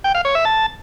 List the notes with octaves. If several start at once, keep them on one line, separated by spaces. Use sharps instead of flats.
G5
F5
C#5
E5
A5